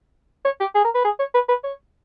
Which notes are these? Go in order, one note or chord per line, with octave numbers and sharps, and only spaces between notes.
C#5
G4
G#4
A#4
B4
G#4
C#5
B4
B4
C#5